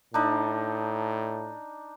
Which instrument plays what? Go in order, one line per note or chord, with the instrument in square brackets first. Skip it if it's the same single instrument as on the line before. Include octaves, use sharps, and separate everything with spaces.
[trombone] A2 [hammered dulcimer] D4 D#4